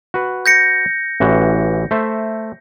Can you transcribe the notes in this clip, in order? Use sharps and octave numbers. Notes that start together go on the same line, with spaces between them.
F#4 B4
G6 A#6 C#7
A1 E3 F#4
A3 C5 E5